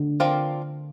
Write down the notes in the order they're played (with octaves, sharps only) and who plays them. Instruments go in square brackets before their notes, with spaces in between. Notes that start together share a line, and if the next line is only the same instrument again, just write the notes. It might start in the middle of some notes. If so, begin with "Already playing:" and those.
Already playing: [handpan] D3
[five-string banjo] F3 C4 F4 A#4 D5